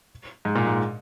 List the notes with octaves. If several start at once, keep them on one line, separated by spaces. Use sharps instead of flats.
G#2
A#2
G#2